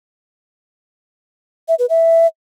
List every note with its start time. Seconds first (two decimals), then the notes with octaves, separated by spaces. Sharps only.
1.68 E5
1.79 B4
1.89 E5